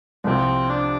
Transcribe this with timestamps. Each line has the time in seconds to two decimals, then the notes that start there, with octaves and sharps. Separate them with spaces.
0.24 C2 C3 F3 C4
0.69 D4